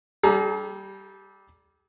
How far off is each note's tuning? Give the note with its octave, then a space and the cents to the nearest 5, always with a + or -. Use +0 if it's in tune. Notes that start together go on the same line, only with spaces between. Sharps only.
G3 -10 G#4 +45 A#5 +0